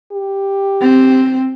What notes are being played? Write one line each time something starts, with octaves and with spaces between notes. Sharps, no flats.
G4
C4